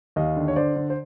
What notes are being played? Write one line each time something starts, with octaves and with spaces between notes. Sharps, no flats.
D#2 D#5 F5
D3
C#5
D3 C5 D5
D3
C5